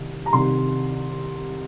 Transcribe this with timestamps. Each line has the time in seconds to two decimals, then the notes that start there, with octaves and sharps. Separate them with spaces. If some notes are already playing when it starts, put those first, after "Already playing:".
Already playing: C2 D#3
0.26 A#5
0.33 C2 C3 D#3 C6